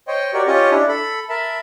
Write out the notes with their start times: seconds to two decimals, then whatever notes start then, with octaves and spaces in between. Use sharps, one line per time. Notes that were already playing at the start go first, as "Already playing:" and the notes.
0.08 C5 C#5 D#5 G5
0.34 F#4 G4 A#4 C#5 D5
0.47 C#4 F4 G4 C#5 D#5
0.71 D4 E4
0.88 A4 B5
1.29 A#4 E5 A5 B5